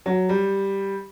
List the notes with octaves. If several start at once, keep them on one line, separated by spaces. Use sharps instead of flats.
F#3
G3